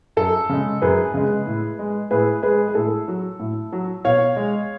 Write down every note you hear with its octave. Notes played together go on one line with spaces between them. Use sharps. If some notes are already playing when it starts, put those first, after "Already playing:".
F#2 A4
C#3 G#3
F#2 G#4 B4
C#3 G#3
A2
G#3
A2 G#4 B4
G#3 G#4 B4
G#4
A2 A4
F#3
A2
F#3
B2 C#5 F5
G#3